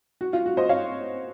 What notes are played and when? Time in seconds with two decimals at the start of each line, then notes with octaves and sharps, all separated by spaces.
0.21 F#4
0.33 F4
0.46 F#4
0.57 C5 D#5
0.69 C#5 F5